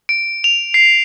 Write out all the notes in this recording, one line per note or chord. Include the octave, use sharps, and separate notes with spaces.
D7
F7
C7